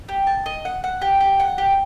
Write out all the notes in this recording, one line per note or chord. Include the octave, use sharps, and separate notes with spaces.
G4
A5
D#5
F#5
F#5
G4
G4
F#5
G4